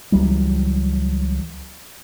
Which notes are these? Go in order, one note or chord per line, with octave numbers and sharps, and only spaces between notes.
C#2 E3 F#3 G3